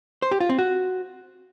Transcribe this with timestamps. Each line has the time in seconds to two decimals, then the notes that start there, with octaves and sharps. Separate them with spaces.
0.22 C5
0.31 G4
0.40 F4
0.49 C4
0.59 F#4